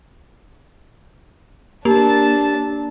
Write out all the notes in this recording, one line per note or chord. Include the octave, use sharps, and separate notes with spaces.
A#3 D4 G4 A5